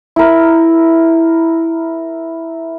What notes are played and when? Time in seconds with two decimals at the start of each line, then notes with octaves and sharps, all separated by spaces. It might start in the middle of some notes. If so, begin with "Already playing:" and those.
0.16 E4 A#4